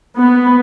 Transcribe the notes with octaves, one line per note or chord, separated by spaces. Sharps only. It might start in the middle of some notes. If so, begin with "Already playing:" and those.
B3